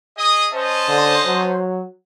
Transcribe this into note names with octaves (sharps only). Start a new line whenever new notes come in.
G#4 D#5 D#6
C#4 C5 D#5 A5
D3
F#3